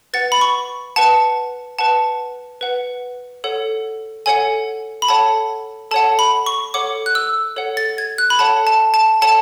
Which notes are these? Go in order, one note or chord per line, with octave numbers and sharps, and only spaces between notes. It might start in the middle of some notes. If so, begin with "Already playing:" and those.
B4 F#5 A6
B5
C#6
B4 F#5 A5
B4 F#5 A5
B4 F#5
A4 C#5 F#5
A4 C#5 F#5 G#5
B5
A4 C#5 F#5 A5
A4 C#5 F#5 A5
B5
C#6
A4 C#5 F#5 D6
F#6
E6
A4 C#5 F#5
A6
G#6
F#6
B5
A4 C#5 F#5 A5
A5
A5
A4 C#5 F#5 A5